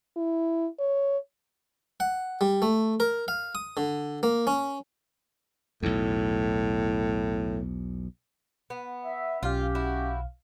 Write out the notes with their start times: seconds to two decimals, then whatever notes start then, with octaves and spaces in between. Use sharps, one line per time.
0.17 E4
0.79 C#5
2.00 F#5
2.41 G3
2.62 A3
3.00 A#4
3.28 F5
3.55 D#6
3.77 D3
4.23 A#3
4.47 C#4
5.83 B1 E2 A2
8.70 B3
9.05 E5
9.43 B1 C#4 F4 G4 F5
9.75 E4 F#4